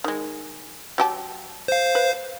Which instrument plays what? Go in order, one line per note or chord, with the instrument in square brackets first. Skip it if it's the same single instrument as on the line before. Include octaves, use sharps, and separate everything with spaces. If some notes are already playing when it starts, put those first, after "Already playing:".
[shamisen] D#3 G#3
F#3 G4 A5
[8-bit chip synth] C5 F5
[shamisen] B4